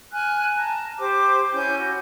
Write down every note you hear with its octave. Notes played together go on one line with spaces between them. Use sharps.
G#5 F6 F#6
A5 A#5
G4 C5 D6
C#4 E4 G#5 G6
F#4